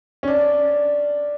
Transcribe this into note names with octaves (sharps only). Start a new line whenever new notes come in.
C#4
D4